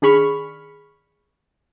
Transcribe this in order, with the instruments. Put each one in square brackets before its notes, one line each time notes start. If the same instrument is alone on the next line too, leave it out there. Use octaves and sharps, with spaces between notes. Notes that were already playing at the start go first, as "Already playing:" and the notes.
[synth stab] D#3 D4 G#4 B5 C#6 F6